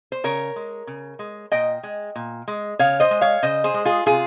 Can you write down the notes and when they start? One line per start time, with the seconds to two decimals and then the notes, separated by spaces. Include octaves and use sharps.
0.12 C5
0.24 C#3 A#4 C#5
0.56 G#3
0.87 C#3
1.19 G#3
1.52 A#2 D#5 G5
1.83 G#3
2.16 A#2
2.48 G#3
2.79 C#3 C#5 F5
3.00 C5 D#5
3.11 G#3
3.21 C#5 F5
3.43 C#3 C5 D#5
3.64 G#4 C5
3.74 G#3
3.85 F4 G#4
4.06 C3 F4 G#4